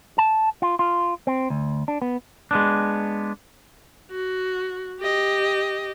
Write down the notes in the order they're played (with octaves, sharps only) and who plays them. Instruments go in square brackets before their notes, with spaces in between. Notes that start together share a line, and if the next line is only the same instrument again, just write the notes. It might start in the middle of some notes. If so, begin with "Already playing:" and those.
[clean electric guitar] A5
F4
F4
C4
D2
D4
B3
G#3 B3 D4
[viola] F#4
G4 D#5